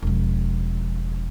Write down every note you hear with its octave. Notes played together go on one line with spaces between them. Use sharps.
E1 F3